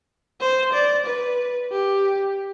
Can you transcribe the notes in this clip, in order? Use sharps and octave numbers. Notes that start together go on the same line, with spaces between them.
C5
D5
B4
G4